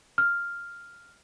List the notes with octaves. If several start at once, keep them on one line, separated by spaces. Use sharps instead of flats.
F6